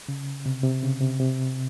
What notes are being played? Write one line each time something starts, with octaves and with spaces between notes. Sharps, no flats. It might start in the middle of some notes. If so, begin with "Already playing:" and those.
C#3
C3
C3
C#3
C3
C3